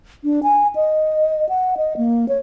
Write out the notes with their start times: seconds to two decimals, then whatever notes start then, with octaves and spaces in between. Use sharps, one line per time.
0.24 D4
0.43 G#5
0.75 D#5
1.49 F#5
1.77 D#5
1.97 A#3
2.29 C#5